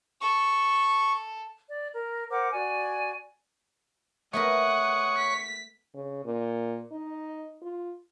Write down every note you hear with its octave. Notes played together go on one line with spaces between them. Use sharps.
A4 C#6
D5
A#4
A#4 C5 F#5 D6
F#4 D5 G#5
A3 B3 A#4 C#5 F#5 C#6 D#6
B6
C#3
A#2
D#4
F4